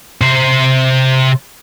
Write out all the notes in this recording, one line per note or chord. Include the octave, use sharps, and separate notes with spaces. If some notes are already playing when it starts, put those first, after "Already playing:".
C3 C5